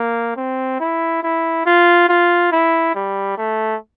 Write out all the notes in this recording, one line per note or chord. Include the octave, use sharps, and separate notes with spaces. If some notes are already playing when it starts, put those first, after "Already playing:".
Already playing: A#3
C4
E4
E4
F4
F4
E4
G3
A3